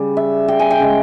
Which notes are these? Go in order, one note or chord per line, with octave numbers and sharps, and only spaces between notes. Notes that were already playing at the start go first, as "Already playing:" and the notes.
Already playing: C#3 G3
E5
G5
G#5
G5
C#3 G#3